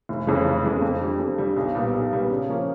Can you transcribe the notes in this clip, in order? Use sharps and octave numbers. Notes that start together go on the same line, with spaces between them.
F1
F2 C#3 E3 G#3
F1
F2 C#3 E3 G#3
F2
D3 G3
F2
D3 G3
B1
A#2 G3 B3
B1
A#2 G3 B3
C#3
F3 A#3 C#4